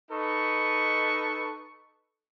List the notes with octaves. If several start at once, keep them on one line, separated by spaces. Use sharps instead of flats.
D#4 A4 B4 C#6